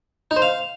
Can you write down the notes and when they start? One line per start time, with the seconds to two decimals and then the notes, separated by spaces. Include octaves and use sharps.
0.31 D#4
0.36 C5
0.42 F5